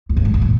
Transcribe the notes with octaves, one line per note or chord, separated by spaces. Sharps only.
F2
F#2
G#2
F#2
A#2